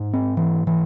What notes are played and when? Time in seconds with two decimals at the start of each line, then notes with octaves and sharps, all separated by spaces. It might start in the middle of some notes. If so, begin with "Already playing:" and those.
Already playing: G#2
0.13 C4
0.37 E3
0.67 E3